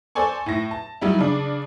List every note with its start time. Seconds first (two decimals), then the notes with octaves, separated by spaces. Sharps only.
0.15 A4 C5 D5 G#5 C#6
0.46 A2 A#6
0.71 A5
1.01 F#3 G3 D#4 E4
1.19 C#3 D4